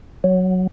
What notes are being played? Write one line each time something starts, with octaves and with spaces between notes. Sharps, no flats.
F#3